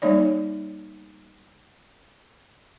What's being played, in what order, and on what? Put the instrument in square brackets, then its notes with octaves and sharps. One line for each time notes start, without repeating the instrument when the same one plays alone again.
[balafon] G3 A#3 D#4 C#5 D5